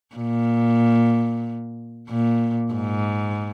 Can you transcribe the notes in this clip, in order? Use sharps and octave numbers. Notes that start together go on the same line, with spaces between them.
A#2
A#2
G#2